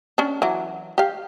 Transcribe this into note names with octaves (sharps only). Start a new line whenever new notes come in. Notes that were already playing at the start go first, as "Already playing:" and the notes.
C#4 D4
E3 F#3
G4 F5